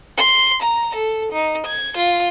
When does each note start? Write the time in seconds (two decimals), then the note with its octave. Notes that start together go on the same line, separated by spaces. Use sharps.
0.18 C6
0.63 A#5
0.95 A4
1.32 D#4
1.67 G#6
1.97 F4